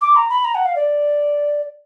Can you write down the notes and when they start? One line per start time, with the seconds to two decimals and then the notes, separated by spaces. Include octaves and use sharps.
0.01 D6
0.16 A#5
0.30 B5
0.44 A#5
0.55 F#5
0.65 F5
0.76 D5